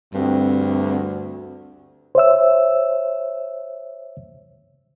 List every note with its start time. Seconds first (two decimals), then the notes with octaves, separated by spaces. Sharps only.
0.14 D2 G2 C4
2.15 C5 C#5 E5 E6